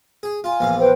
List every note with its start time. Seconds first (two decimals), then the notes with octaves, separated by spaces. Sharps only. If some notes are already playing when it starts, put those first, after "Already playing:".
0.23 G#4
0.44 F4 G#5
0.60 A#1 E2 F5
0.79 B4 C5 G5